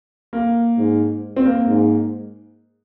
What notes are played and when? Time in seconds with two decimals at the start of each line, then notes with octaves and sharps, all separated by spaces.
0.33 A#3
0.78 G#2
1.36 C4
1.46 A#3
1.67 G#2